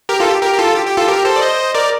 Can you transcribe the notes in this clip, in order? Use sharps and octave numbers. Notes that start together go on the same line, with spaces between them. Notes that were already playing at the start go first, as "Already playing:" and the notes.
G4 A#4
F4 A4
G4
G4 A#4
G4
F4 A4
G4
G4
F4 A4
G4 A#4
A4 C5
D5
C5 D#5
A#4 D5